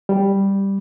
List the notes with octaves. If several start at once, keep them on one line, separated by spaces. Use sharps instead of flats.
G3